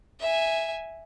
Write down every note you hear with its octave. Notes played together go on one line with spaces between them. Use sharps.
E5 G#5